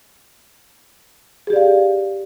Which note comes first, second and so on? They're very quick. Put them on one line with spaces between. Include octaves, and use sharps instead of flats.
G#4 G4 D5 F5